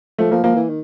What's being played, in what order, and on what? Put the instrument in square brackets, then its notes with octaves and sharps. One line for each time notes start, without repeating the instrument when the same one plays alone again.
[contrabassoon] F3 [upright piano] A3
[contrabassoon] F3 [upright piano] A#3
[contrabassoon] F3 [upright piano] A#3
[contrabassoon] E3
D#3